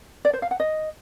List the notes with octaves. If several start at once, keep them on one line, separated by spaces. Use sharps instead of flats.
D5
C5
F5
F#5
D#5